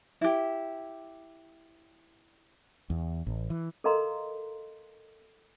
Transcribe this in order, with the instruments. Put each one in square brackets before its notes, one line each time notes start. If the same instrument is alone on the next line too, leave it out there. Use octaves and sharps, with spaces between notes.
[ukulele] E4 G4
[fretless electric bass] E2
A1
E3
[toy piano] A4 A#4 D#5 F5 A#5 C6